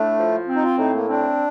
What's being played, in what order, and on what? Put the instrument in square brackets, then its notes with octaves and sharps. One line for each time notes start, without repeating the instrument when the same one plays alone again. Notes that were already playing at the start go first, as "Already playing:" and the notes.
Already playing: [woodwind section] A2 D4 [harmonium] A3
[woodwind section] F3
C4
[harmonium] D#4
F4
[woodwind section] A2 [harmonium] D#4
[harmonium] A#3
[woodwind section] C4 [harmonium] D4